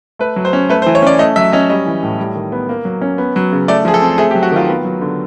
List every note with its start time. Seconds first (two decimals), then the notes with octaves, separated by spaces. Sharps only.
0.19 A3 B4
0.36 F#3
0.45 C5
0.53 C#4
0.69 A3 B4
0.82 C5
0.86 E3
0.95 C#5
1.02 C#4 D5
1.19 A3 D#5
1.36 F#3 E5
1.52 C#4 D#5
1.70 G3 D#5
1.86 E3
2.03 A2
2.19 G3
2.36 D#3
2.52 B3
2.69 A#3
2.85 F#3
3.01 C#4
3.18 B3
3.36 F#3
3.52 C#3
3.68 A3 D5
3.85 F3 G#4
3.94 A4
4.02 C4
4.18 A3 G#4
4.31 G4
4.35 F#3
4.43 F#4
4.51 D#3 F4
4.67 B3
4.85 F#3
5.01 D3